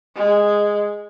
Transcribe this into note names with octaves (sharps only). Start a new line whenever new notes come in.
G#3